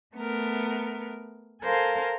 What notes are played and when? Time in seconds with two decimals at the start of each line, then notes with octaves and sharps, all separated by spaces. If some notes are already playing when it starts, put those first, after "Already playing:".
0.15 A3 B3 A#4
1.62 A4 A#4 C5 F5 G#5